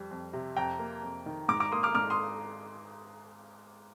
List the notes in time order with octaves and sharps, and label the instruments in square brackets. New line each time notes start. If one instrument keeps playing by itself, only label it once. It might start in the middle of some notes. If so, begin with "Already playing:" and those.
Already playing: [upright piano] F2 G3
F2
C3
F2 G5 A#5
A#3
F2
D#3
G#2 A#5 D6
A#5 D6
A#3 C6 D#6
D6 F6
G#2 D6 F6
C6 D#6